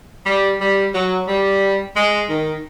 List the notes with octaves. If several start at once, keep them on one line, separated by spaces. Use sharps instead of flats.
G3
G3
F#3
G3
G#3
D#3